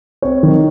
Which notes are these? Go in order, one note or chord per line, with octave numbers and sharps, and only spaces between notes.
C4 C#5
D#3